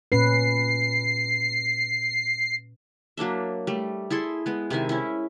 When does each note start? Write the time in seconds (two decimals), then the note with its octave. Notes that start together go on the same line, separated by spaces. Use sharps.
0.12 A#2 C#4 B4 C7
3.17 F#3 A#3 D4 E5
3.67 G3 A3
4.10 E4 G#4 A4 C6
4.46 G#3 B3
4.70 C3 D#3 E4 G#5
4.89 C#4 E4